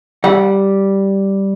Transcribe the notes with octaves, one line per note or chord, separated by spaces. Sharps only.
G3 F#5